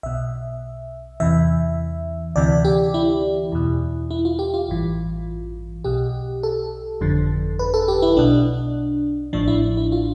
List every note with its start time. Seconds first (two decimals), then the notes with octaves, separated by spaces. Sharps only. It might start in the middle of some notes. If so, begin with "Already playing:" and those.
0.03 B1 B2 E5
1.20 E2 C3 E3 E5
2.36 D2 C3 E3 D5
2.65 G4
2.94 E4
3.52 E2 B2
4.11 E4
4.25 F4
4.39 G4
4.54 F4
4.69 A1 G2 E3
5.84 B1 B2 G4
6.43 A4
7.01 G1 F2 D3 F3
7.59 B4
7.74 A4
7.88 G4
8.02 E4
8.17 B1 B2 D4
9.33 A1 A2 F3 D4
9.48 E4
9.77 E4
9.92 F4